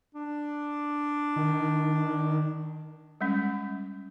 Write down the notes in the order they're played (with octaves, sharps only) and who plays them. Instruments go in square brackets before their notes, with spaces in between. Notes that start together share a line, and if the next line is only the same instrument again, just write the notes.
[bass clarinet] D4
[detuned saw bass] D#3
[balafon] G3 G#3 C#4